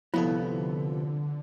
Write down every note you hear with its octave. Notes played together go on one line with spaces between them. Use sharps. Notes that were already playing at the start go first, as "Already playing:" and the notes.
C2 D3 F3 B3 E4 F4 A4